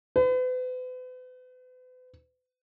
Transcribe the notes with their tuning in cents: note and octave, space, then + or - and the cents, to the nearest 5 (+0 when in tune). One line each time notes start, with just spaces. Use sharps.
B4 +40